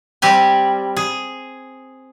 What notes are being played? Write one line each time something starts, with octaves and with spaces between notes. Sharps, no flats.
G3 C4 G4 G#5
G#4